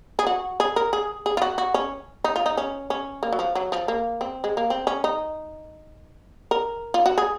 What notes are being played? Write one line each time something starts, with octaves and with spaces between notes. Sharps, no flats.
G#4
F#4
G#4
A#4
G#4
G#4
F4
F#4
F#4
C#4
D#4
F4
D#4
C#4
C#4
A#3
F#3
F3
F#3
F3
A#3
C4
G#3
A#3
C4
C#4
D#4
A#4
F4
F#4
G#4